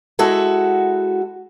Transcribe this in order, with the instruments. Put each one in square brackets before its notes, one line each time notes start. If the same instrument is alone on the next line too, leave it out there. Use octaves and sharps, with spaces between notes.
[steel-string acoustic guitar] G#3 E4 F#4 A4